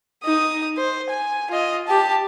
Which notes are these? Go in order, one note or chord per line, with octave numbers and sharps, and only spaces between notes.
D#4 D#6
C5
G#5
F4 D#5
G4 A5